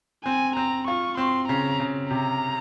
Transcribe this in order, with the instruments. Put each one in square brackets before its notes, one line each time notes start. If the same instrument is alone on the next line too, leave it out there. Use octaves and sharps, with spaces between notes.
[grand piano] C4 [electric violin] G#5
[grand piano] C4 [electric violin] A#5
[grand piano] F4 [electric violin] C#6
[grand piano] C4 [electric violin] C6
[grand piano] C#3 [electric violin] A#5
[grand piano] C#3
[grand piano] C3 [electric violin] A#5